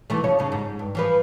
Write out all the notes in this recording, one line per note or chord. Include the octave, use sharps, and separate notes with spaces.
B2 E3 A3
C#3 F3 C#5
D#2 C#3
G#2
G2
E3 F3 B4